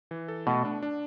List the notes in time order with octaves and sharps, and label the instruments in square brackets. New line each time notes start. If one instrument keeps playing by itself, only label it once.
[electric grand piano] E3
A4
[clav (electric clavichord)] B2 [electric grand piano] A3
[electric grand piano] D4
D4